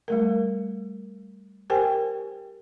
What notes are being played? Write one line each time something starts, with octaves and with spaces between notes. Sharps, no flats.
G3 A3 A#4
G4 A#4 C5 G5 G#5